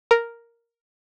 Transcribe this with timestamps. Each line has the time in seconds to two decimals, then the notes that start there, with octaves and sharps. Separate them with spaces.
0.11 A#4